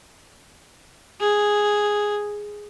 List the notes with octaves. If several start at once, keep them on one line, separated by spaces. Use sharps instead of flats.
G#4